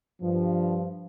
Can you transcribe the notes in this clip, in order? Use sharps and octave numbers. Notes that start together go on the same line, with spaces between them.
G2 F3